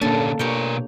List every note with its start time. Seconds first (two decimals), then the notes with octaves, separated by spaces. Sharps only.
0.02 A#2 D3 A#3 C#4 D4 A4
0.39 B2 G4 A#4 C#5 G5